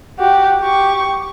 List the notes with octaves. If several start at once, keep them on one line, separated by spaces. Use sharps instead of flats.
F#4 G4
G4 C#6